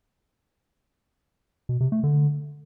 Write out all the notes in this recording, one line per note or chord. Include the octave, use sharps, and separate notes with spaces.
B2
C3
A3
D3